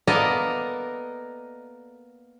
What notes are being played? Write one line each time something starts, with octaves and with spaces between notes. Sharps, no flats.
A#3 B3 A4 A#4 D5 D#5